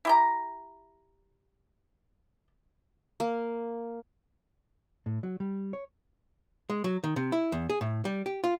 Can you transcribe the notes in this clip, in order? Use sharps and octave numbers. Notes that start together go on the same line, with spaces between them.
E4 G4 A#5
A#3
A2
F#3
G3
C#5
G#3
F#3
D#3
C3
E4
E2
G#4
A2
G3
G4
F4